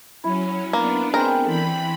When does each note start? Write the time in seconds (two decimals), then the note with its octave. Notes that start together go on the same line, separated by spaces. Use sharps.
0.24 F#3 C#4 E4
0.73 A#3 B3 D4
1.14 G#3 C4 A#4 G#5
1.45 E3 A4 D5 G5 B5